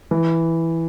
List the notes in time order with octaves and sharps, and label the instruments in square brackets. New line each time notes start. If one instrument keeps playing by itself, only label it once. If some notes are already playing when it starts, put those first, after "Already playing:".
[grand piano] E3